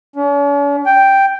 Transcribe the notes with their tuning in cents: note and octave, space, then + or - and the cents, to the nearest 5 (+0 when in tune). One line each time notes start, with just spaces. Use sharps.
C#4 +45
G5 +0